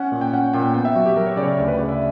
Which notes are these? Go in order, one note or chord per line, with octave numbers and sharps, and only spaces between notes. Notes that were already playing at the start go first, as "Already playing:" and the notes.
Already playing: C#4 F#5
A#2
G5
C#4 F#5
A#2 G5
B3 G5
E5
F#3 F#4
G4
F#3 A#4
C#5
C#3 D5
C#5
D5
D2 C#5
B4
C#3 D5
E5